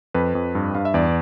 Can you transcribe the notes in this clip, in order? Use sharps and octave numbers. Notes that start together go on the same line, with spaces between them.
F2 B4
F2
G2
G2 F5
E5
E2 D5